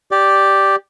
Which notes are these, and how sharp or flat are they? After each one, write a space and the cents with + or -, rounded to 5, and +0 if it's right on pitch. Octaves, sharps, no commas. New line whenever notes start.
G4 +0 D5 +0